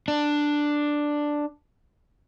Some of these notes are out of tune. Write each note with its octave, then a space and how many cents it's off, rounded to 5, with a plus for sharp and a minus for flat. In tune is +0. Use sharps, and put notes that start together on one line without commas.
D4 +5